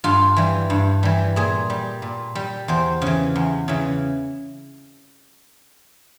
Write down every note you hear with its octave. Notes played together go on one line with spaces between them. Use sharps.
G2 F4
E3 G3
G2
E3 G3
A#2 G#4
G3
A#2
G3
E2 C5
C#3 E3
E2
C#3 E3